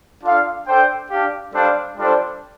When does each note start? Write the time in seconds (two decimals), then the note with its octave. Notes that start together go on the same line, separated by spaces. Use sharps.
0.22 D4 F4 A4 F5
0.66 D4 A4 C5 G5
1.09 D4 G4 F5
1.53 G3 D4 A4 C5 F5
1.97 G3 D4 F4 A4 C5